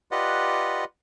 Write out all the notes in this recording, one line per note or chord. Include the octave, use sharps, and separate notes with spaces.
F4 G4 B4 D5 D#5 F#5